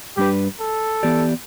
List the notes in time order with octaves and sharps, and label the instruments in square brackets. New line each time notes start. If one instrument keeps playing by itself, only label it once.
[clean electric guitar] G2 G3 D4 B4 [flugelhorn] G4
[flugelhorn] A4
[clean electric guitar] E3 B3 G4 D5